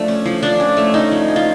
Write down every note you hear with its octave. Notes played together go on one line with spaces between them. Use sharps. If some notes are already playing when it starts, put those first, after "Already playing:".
Already playing: F3 A3 D4
C#4
F3
F3 D4
C#4
A3
C#4 D#4
F3
C#4
F4